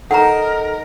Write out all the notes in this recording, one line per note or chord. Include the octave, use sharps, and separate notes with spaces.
D#4 A4 A#4 F#5 A#5